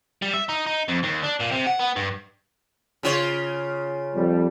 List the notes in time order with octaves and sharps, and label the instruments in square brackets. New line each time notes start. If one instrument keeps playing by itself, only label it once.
[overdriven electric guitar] G3
E5
D#4
D#4
F2
D#2
D4
A#2
C3
F#5
B3
G2
[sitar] C#3 F4 C#5
[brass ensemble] F2 G3